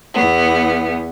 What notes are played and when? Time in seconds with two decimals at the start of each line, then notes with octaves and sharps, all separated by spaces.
0.15 E2 B3